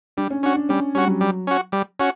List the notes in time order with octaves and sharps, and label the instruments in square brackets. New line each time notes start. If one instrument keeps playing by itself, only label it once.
[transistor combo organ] G3 [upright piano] D4
[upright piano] C#4
[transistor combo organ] C#4 F#4 [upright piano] D4
[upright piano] D4
[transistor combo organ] G3 [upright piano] C#4
[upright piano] G3 [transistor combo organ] C#4
[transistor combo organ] F#4
[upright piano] F#3
[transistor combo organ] G3
C#4 F#4
G3
C#4 F#4